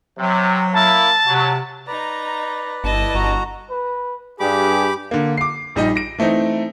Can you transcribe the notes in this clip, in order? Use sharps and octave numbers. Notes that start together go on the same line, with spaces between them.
C3 F#3
A#3 E4 A5
C3 F#3
D#4 B4 D5 A#5
G1 E4 D#5 A5
G1 F#4 A#5
B4
G2 G4 G#4 B5 D6
D3 A#3
D6 C7
A#1 G3 D#4 D#5
A#6 D7
E3 A3 C4 D#4